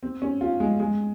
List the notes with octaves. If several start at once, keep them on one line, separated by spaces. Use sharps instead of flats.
C4
C#4
F4
G#3
G#3